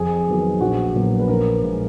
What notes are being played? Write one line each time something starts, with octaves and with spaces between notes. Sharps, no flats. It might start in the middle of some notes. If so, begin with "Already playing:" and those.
Already playing: F2 G#4
D#3 F#3 B3
A#1 F#4
A#2 F#3 B3
B4
A#1 A#4
A#2 G#3